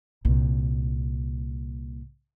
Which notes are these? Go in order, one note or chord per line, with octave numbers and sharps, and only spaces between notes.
C2 A#2